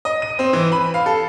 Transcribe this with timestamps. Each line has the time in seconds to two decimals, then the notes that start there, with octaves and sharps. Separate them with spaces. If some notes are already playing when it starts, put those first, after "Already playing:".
0.05 D#5
0.22 D#7
0.39 C4
0.53 E3
0.72 B5
0.94 F5
1.06 A4